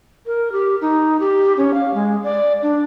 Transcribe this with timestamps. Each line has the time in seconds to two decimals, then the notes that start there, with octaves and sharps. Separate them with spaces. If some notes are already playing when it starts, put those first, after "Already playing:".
0.26 A#4
0.52 G4
0.81 D#4
1.19 G4
1.57 C#4
1.74 F5
1.94 G#3
2.23 D5
2.62 D4